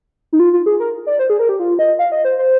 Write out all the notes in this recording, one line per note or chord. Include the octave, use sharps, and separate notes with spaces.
D#4
F4
F4
G#4
A#4
D5
C5
G#4
A#4
G4
F4
D#5
F5
D#5
C5
C5